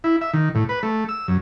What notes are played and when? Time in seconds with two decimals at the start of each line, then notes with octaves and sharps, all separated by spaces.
0.04 E4
0.21 E5
0.34 D#3
0.55 A2
0.69 B4
0.83 A3
1.09 E6
1.28 F#2